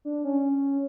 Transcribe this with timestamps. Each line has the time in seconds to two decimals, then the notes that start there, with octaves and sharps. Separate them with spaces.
0.05 D4
0.24 C#4